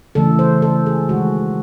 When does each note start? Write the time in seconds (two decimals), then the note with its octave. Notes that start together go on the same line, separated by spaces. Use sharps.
0.15 C#3 E3 A3 A4
0.39 C5
0.62 A4
0.86 G#4
1.09 D#3 G#3 F#4